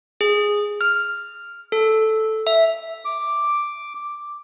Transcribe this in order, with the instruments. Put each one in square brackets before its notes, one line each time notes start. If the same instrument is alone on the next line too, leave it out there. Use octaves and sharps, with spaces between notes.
[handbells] G#4
F6
A4
E5
[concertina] D6